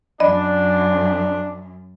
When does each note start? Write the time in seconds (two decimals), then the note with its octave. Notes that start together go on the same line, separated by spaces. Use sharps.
0.20 F#2 D4 D5 D#5 B5